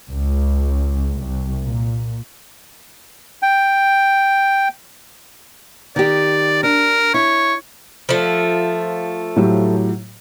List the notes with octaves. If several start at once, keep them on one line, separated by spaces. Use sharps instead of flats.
C#2
C2
A#2
G5
D#3 G4 D5
D4 A#4
E4 C#5
F3 A3
A2 F#3 G4